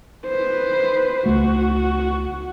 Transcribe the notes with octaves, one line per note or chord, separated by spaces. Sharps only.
B4 C5
C#2 A3 F#4